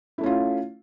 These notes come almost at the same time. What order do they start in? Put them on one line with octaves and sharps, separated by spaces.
E4 A3 C#4 F4